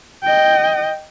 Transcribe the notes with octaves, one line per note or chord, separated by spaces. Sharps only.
D#5 G5